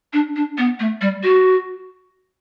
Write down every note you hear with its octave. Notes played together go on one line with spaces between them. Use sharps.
D4
D4
B3
A3
G3
F#4